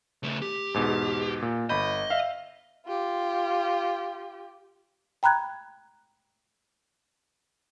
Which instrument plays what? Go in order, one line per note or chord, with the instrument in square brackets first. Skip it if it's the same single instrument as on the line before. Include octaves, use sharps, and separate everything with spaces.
[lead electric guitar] C#3 A3
G4
[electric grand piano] E2 G#2 B2
A#2
[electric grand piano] G1 B5 G6 [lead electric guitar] D#5
[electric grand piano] E5 F5
[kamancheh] F4 G4
[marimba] G5 A#5 B5 F#6 G#6